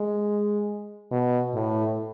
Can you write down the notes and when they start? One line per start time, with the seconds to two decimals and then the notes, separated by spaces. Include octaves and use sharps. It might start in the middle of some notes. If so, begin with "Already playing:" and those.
Already playing: G#3
1.11 B2
1.54 A2